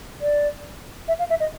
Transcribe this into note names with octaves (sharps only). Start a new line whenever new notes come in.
D5
E5
F5
E5
D#5